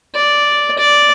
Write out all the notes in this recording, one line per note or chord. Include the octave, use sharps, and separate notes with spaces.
D5
D5